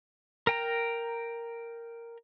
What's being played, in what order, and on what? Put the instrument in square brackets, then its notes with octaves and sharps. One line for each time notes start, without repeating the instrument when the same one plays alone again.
[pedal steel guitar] A#4 G5 A#5